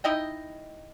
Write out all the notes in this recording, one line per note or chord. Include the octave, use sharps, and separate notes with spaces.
D#4 E4 D#5 G5